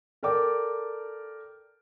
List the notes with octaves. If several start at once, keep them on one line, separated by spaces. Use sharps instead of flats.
A4 A#4 D5 G5 D6